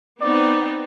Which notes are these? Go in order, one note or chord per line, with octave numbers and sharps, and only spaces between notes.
B3 C4 D#4 D5